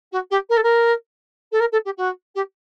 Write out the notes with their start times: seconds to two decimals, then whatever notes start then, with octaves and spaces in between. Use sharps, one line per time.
0.12 F#4
0.30 G4
0.49 A#4
0.57 A4
0.63 A#4
1.52 A4
1.60 A#4
1.72 A4
1.85 G4
1.97 F#4
2.35 G4